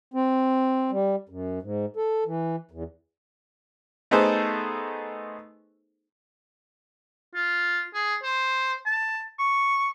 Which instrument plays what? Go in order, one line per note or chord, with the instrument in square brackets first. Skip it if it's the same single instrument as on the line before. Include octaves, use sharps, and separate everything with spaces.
[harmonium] C4
G3
F#2
G#2
A4
E3
E2
[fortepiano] A3 B3 D#4 G#4 A4 C5
[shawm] F4
G#4
C5
A5
C#6